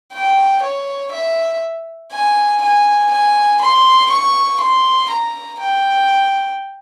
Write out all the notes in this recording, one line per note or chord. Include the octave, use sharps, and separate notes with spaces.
G5
C#5
E5
G#5
G#5
G#5
C6
C#6
C6
A#5
G5